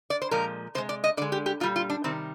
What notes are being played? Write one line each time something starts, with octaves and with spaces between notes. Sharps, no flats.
D5
C5
A#2 F3 G#3 A#4
C3 F3 G#3 C5
D5
D#5
D3 G#3 D5
G4
G4
A#2 G3 F4
F4
D4
C3 D#3 G3 C4